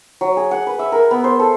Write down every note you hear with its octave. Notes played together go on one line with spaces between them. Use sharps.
F#3
G#4
F#5
B4
E5
A#4
B3
C5
A4